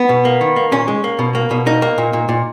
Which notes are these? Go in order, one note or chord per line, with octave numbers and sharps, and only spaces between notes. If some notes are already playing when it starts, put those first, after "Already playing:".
Already playing: B3
B2
A#3
D#3
A#3
A#2 C#4
G#3
A#3
B2
A#3
B2
A#3 D#4
A#3
A#2
A#2
A#2